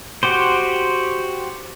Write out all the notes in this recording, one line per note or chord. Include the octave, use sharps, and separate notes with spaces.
F#4 G4 C5